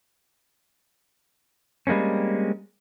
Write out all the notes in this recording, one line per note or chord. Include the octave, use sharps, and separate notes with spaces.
G3 G#3 A#3 C4 C#4